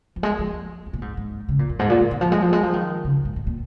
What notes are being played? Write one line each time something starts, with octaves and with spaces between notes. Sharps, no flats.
F3
G#3
F3
F2
A#2
G#2
G#2
C#3
A#2
F2
G#2
A#2
D#3
D#3
F3
G#3
F3
G#3
F3
D#3
C#3
G#2
G#2
A#2